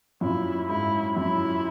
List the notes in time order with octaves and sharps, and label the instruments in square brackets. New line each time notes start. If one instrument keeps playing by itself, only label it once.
[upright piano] F#2 A#2 [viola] E4
[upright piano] G#2 [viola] E4
[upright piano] F#2 [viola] E4